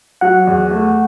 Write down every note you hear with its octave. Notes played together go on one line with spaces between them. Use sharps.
F#3 F#5
E2
A3